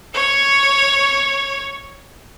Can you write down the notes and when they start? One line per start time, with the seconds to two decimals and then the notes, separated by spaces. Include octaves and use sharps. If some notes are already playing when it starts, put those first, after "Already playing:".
0.14 C#5 C#6